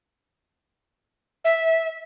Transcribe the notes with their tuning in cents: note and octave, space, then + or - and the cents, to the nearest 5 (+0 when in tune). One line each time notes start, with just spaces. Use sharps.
E5 -10